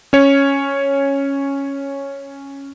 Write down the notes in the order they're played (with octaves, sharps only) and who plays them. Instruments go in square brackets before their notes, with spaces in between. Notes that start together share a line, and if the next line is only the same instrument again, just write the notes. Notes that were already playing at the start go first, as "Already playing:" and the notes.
[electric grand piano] C#4 C#5